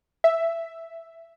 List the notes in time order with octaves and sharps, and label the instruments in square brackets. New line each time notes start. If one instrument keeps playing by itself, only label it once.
[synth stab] E5